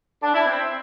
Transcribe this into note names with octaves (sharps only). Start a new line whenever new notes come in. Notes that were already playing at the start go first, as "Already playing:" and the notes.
D4
E4
C4